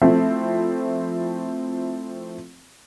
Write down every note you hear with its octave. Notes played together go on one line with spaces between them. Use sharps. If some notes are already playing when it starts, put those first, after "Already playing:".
F3 A3 C4 E4